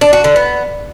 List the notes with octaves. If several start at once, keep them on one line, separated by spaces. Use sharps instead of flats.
D4
F#4
D3
B3